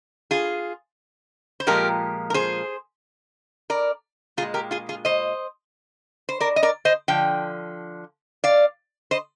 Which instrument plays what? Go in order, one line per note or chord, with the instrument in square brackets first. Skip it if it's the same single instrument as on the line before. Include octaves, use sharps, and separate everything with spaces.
[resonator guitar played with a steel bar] F4 G#4
C5
A#2 F3 G#3 G4 A#4
A#4
G#4 C5
A#4 D5
A#2 F4 G#4
G#3
G4 A#4
F4 G#4
F4 G#4
C5 D#5
C5
A#4 D5
D#5
A#4 D5
C5 D#5
D3 F3 G5
D5 F5
C5 D#5